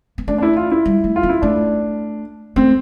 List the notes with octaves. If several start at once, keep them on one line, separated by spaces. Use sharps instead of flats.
B3
A3 D4
D4
E4
F4
E4
G3
A3
F4
B3
E4
A3 D4
A3 C4